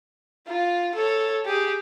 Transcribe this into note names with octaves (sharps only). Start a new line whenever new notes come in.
F4
A4 C#5
G4 G#4